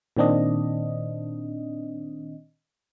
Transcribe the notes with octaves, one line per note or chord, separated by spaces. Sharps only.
A#2 D#3 C4 D4 D#5